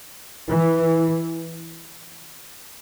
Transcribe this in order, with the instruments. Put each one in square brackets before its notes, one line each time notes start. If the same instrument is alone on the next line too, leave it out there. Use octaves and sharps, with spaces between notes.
[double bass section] E3